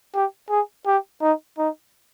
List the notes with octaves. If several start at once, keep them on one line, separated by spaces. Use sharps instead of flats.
G4
G#4
G4
D#4
D#4